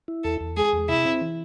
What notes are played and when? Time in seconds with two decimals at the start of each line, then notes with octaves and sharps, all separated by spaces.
0.08 E4
0.24 E2 A4
0.41 E2
0.57 G#3 G#4
0.73 E2
0.89 C3 E4
1.05 C4
1.21 E3